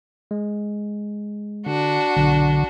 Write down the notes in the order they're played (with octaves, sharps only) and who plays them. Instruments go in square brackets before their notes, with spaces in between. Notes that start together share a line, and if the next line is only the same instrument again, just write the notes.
[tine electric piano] G#3
[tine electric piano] D3 [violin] D4 F#4
[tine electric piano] B1 [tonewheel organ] D3